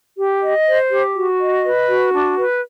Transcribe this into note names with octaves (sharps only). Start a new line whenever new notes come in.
G4
D#5
C5
G4
F#4
D#5
B4
F#4
D4
B4